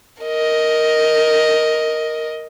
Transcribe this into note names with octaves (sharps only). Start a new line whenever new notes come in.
A#4 D#5